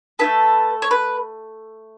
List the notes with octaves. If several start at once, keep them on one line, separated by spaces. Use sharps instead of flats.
A3 E4 A4 B4
C#5
B4